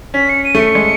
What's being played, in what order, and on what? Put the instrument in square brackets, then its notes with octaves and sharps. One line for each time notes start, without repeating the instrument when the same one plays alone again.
[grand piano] C#4 [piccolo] B6
[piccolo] C#7
D#7
[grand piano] A3 [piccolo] C#7
[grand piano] G#3